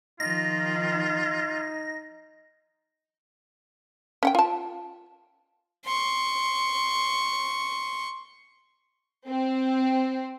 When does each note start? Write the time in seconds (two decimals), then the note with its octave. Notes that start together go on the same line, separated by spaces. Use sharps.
0.20 D#3 F3 D#4 F4 A#6
4.23 C#4 F#5 G5
4.35 F4 A5
5.86 C6 C#6
9.27 C4